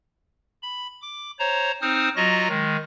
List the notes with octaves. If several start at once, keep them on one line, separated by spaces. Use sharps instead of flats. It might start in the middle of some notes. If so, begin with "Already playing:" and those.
B5
D6
C5 C#5 A#5
C4 D#4 C5 D#6 F6
F#3 F4 F#4 D#5 A#5 A#6
D#3 G#3